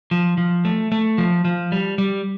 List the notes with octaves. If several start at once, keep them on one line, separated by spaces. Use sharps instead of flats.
F3
F3
A3
A3
F3
F3
G3
G3